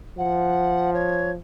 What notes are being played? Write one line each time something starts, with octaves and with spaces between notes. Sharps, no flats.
F3 F#5
C#5